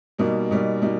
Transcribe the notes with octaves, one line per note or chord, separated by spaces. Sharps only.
B2 G3 A#3 D#4
B2 G3 A#3 D#4
B2 G3 A#3 D#4